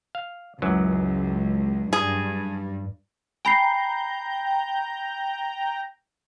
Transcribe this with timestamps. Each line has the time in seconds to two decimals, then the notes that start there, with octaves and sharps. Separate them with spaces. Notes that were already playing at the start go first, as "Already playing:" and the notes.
0.15 F5
0.62 C#2 F#2 E3 F#3
1.93 G2 G#4
3.45 G5 G#5 A#5 B5 G6 C7